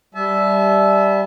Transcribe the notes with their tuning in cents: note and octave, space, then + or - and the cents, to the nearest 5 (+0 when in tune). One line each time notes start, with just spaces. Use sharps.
G3 +0 E5 +0 A5 -35